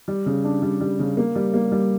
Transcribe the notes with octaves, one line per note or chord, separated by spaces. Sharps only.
G3
C#3
D4
G3
G3
C#3
A#3
G3
A#3
G3